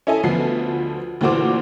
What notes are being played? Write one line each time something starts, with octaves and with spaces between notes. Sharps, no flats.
C#4 E4 A4 D#5 G#5
D2 F3 B3 C7
D2 A#2 E3 F#4 C5 D6